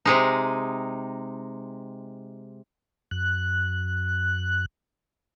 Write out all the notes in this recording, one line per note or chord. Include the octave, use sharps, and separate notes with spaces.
C3 G#3 D#4
F#2 F#6